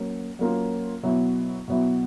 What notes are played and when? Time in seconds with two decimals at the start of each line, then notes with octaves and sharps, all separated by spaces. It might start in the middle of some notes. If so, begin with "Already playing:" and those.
Already playing: F#3 A#3 C#4
0.39 F#3 A#3 C#4 F4
1.03 B2 F#3 B3 E4
1.68 B2 F#3 B3 E4